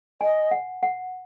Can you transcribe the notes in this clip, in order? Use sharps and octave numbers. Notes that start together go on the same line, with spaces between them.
D#5 G#5
F#5
F#5